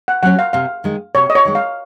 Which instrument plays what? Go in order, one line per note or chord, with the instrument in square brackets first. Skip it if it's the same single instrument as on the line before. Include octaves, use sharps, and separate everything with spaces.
[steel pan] F#5
[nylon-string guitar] F#3 C#4 F#4 [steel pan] F#5
[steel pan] F5
[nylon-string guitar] C3 [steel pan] F5
[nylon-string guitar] D#3 G#3
[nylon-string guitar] C3 [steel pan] C#5
[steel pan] D#5
C#5
[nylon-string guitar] D#3 G#3
[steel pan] F5